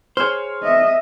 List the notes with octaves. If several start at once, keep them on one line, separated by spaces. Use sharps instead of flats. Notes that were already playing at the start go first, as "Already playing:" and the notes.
G#4 C5 C#5 C6 F6
D#5 E5